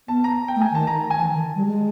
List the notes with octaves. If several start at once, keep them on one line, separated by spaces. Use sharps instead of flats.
B3 A5
A#5
G5
A3
G#5
D#3 A5
A#5
G#5
E3 A5
D#3
G3
G#3